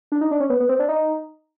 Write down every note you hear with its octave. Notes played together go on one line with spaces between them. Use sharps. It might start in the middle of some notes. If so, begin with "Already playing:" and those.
D4
D#4
D4
C#4
B3
B3
C4
D4
D#4